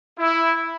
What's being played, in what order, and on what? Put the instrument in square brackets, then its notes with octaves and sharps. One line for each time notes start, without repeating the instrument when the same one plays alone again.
[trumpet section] E4